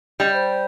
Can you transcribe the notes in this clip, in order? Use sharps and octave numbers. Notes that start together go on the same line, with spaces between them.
G3 D#5
C5